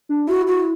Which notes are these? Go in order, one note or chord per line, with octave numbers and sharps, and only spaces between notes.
D4
E4 F#4
F#4